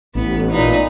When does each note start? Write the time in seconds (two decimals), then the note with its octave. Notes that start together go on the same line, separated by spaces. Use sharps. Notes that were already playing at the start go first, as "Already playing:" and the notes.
0.15 A1 B3
0.51 A#2 D#4 B4